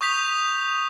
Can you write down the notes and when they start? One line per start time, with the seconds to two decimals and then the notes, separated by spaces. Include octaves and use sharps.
0.01 C#6 D#6 G6 B6 F7